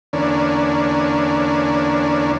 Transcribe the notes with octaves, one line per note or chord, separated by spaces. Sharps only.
E2 D3 A#3 C#4 D4